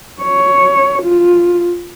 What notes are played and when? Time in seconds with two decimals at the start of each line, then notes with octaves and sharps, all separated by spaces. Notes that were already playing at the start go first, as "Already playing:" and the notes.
0.22 C#5
1.03 F4